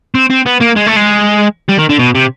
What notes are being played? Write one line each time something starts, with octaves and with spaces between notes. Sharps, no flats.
C4
C4
B3
A#3
G#3
A3
G#3
G3
D#3
D3
B2
C3